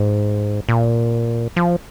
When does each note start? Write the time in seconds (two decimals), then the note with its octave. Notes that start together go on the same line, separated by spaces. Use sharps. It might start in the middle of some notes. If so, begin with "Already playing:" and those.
Already playing: G#2
0.69 A#2
1.56 F3